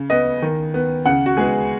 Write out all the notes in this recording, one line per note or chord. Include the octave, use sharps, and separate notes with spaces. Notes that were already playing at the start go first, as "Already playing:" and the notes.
Already playing: C#3
B3 D#5
D#3
B3
C#3 F#5
F#4
G#3 B3 G#4